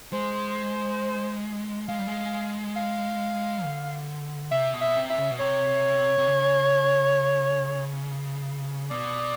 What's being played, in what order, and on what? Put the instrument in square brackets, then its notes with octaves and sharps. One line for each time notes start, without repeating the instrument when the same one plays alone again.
[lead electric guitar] G#3 [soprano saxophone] C5
[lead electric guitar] G#3 [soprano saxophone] F5
[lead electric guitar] G3
G#3
[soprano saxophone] F5
[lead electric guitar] D3
[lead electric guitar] C3 [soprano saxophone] E5
[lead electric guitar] B2
[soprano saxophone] E5
[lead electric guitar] C3
[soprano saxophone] E5
[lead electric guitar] C#3
B2
[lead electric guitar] C3 [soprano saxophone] C#5
[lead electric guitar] C3
C#3
[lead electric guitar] B2 [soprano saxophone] D5